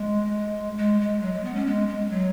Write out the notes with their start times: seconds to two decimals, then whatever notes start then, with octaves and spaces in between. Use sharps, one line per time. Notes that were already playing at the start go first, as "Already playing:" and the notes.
Already playing: G#3
0.78 G#3
1.00 G#3
1.22 F#3
1.33 G#3
1.44 B3
1.55 C#4
1.66 G#3
1.88 G#3
2.10 F#3